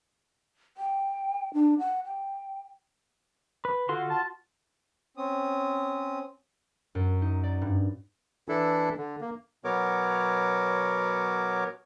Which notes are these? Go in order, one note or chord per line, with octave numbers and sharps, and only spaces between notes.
G5
D4
F#5
G5
B4
D3 F4 F#4 C6
A5
C4 C#4 D#6
F#2
D#4
D5
G2
E3 D4 E4 A4
D3
A#3
B2 F#3 B3 A#4 C#5 D6